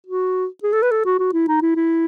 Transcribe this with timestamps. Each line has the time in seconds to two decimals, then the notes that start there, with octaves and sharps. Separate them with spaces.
0.07 F#4
0.63 G#4
0.73 A4
0.82 B4
0.91 A4
1.05 F#4
1.19 F#4
1.33 E4
1.48 D#4
1.62 E4
1.76 E4